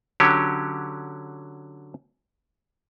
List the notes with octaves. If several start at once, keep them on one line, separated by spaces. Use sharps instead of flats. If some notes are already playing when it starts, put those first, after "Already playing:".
D3 F#3 C#4 G4